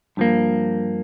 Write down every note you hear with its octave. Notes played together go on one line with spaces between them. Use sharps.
G2 F3 A#3